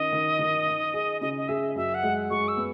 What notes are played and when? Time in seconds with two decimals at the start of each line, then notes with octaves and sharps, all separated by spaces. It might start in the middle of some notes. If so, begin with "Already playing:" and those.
Already playing: D#3 C#4 D#5
0.13 D#3
0.39 D#3
0.67 D#4
0.94 G#4
1.21 C#3 D#5
1.37 D#5
1.48 G#4 E5
1.76 F#2 E5
1.94 F#5
2.03 G#3
2.30 G#3 C#6
2.48 E6
2.57 B3